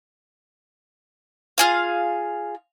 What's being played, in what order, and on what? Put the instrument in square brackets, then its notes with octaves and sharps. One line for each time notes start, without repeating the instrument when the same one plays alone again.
[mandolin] F4 G#4 F5